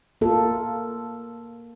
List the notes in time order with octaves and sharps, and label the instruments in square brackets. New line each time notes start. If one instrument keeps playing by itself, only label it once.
[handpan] A#3 F4 A4